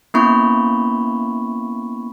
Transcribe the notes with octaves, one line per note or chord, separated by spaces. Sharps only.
A#3 B3 C#4 E4 B5 C#6